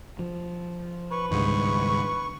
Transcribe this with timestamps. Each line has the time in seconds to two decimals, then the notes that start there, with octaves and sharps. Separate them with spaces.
0.19 F3
1.11 B4 C#6
1.31 C#2 G#2 D#3 G3 D4 C#6